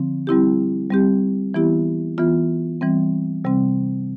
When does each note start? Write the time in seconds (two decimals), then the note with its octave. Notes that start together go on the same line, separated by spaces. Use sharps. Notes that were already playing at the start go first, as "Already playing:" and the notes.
Already playing: D3 F3 C4
0.27 G3 C4 E4 G4
0.91 G3 C4 G4
1.54 E3 B3 E4 G4
2.18 E3 B3 F4
2.81 E3 G3 C4
3.44 C3 G3 C4